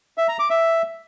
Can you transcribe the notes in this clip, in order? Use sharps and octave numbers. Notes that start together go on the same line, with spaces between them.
E5
A#5
D6
E5